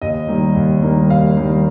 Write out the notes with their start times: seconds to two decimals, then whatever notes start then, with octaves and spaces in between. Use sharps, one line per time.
0.02 D#2 D#5
0.28 D#3 G3 A#3
0.56 D#2
0.82 D#3 G3 A#3
1.10 D#2 F5
1.37 D#3 G3 A#3